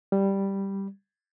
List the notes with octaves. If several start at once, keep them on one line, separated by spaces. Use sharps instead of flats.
G3